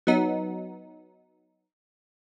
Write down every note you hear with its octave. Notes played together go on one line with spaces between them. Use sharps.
F#3 B3 D#4